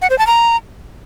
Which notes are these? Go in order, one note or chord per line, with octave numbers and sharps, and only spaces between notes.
F#5
C5
A5
A#5